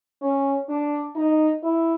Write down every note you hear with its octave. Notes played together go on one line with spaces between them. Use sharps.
C#4
D4
D#4
E4